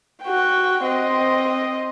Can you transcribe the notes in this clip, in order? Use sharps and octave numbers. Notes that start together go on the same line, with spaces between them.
F#4 G5
C4 D#5